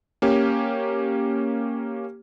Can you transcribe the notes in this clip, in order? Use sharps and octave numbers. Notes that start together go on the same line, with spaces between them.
A#3 C#4 G4